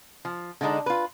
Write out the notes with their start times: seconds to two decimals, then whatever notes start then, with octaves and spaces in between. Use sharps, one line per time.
0.25 F3
0.61 D3 G3 G#3 D4 D#4
0.86 F4 B4